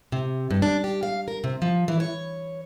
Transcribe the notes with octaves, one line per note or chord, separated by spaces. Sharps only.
C3
G2
D4
G4
F5
A#4
C3
F3
E3
C#5